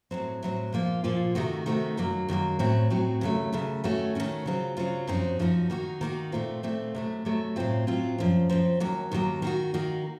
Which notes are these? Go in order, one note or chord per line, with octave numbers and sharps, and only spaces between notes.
A2 F#3 C4
A2 F#3 C4
A#2 F3 A#3 F4
A#2 F3 A#3 F4
C3 D#3 A3 D#4 F#4
C3 D#3 A3 D#4 F#4
F#2 D#3 F#3 A#3
F#2 D#3 F#3 A#3
A2 F#3 C4 F#4
A2 F#3 C4 F#4
D#2 C#3 F#3 A3
D#2 C#3 F#3 A3
D#3 A3 C#4 F#4
D#3 A3 C#4 F#4
C#3 F#3 C4 F4
C#3 F#3 C4 F4
F#2 F3 C4 D#4 F#4
F#2 F3 C4 D#4 F#4
D#3 A#3 D#4 F#4
D#3 A#3 D#4 F#4
A#2 A3 C4 F4
A#2 A3 C4 F4
C3 F#3 A3
C3 F#3 A3
A2 F#3 C4 F4
A2 F#3 C4 F4
F#2 F3 C4
F#2 F3 C4
D#2 D#3 F#3 A#3
D#2 D#3 F#3 A#3
D#3 A#3 D#4 F#4
D#3 A#3 D#4 F#4